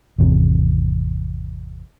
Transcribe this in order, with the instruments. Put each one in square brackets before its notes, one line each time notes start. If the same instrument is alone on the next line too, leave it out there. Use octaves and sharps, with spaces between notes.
[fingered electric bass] G#1 E2 C3